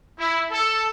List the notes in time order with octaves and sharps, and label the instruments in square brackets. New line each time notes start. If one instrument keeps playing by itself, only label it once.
[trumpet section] E4
A4